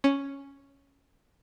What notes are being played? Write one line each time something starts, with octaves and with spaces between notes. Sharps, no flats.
C#4